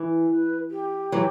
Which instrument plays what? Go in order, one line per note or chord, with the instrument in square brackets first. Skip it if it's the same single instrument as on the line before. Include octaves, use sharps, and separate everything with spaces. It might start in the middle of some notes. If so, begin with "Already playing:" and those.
Already playing: [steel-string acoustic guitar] E3
[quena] B4
G4
[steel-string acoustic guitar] E3 F#3